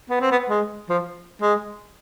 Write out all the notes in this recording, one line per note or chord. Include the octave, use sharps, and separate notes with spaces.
B3
C4
B3
G#3
F3
G#3